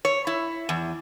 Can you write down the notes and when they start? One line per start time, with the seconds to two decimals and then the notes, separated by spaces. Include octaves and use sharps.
0.05 C#5
0.27 E4
0.69 E2